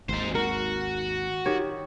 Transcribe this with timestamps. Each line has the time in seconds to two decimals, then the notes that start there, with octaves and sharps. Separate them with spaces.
0.09 G#1 D#2 D#4 C5
0.35 F#4 A#4
1.46 D#3 G4 C#5